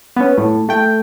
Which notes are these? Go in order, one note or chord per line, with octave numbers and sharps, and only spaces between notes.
B3 C#4
A2
A3 G5